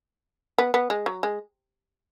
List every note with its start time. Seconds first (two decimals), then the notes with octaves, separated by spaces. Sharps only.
0.58 B3
0.74 B3
0.90 G#3
1.06 F#3
1.23 G#3